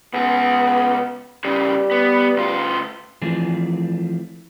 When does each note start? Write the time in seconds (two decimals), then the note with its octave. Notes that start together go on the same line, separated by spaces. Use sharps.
0.14 C#2 B3 G#4
1.44 C#3 E3 G3
1.91 B3
2.36 D2 F4
3.22 E3 F3 A3 C4 G#4